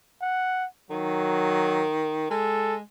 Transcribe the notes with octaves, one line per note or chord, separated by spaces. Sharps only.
F#5
D#3 F#3
G#3 A4